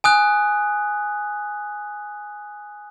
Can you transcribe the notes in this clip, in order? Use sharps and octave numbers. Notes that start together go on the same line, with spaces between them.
G#5 D#6 F#6